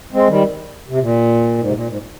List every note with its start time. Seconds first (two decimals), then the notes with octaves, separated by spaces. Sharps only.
0.13 G#3 C4
0.28 D#3 G3
0.88 C3
1.00 A#2
1.58 G#2
1.67 C3
1.73 A#2
1.86 G#2